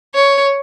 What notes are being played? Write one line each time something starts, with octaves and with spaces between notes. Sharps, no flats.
C#5